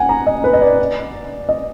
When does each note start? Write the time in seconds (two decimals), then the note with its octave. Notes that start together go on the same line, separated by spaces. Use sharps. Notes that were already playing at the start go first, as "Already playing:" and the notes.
Already playing: F#5 G#5
0.09 A#5
0.27 D#5
0.44 B4
0.53 D#5
0.61 D5
1.49 D#5